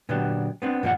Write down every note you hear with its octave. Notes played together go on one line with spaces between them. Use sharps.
A#2 D3 F#3 B3 D4 G4
B3 C4 D4
G2 A#2 D#3 F3 F#5